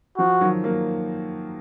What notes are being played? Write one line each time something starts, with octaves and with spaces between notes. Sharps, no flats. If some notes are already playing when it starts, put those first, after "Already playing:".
F3 F#4
D#3 F#3
F#3 A#3